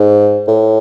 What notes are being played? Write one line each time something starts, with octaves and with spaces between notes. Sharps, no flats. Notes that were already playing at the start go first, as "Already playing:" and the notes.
Already playing: G#2
A2